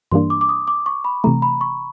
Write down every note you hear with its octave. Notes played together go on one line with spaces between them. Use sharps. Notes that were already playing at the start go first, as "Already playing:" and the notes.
G2 E3 G3 A#3 D4 C6
D6
D6
D#6
D6
C#6
B5
C3 E3 A3 A#5
B5
C#6